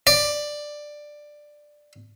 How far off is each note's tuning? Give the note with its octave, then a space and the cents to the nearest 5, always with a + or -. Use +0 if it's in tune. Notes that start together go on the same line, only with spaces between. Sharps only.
D5 +10